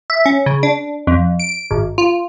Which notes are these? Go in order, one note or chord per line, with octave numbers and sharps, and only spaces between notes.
E5
C#4
C#3
D4
F2
D7
G#1
F4